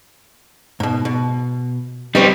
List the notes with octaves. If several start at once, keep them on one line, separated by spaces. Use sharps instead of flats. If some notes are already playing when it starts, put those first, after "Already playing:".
G#2 B2
B2
G3 C4 D#4 B4 C#5